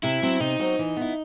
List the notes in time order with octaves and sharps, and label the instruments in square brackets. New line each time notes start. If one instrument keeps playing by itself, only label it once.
[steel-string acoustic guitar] C3 [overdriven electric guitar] E4
[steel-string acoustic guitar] F#3 C4 F#4
[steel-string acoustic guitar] C3 [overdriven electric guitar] D#4
[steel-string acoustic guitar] F#3 C4 F#4
E3
B3 E4